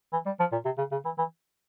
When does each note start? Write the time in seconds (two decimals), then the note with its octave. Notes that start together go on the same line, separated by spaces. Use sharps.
0.13 E3
0.26 G3
0.40 F3
0.52 A#2
0.65 C3
0.78 C#3
0.92 C#3
1.05 E3
1.18 E3